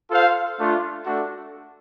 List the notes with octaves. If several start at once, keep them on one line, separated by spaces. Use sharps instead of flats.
F4 A4 C5 F5
A3 D4 F4
A3 D4 F#4 A4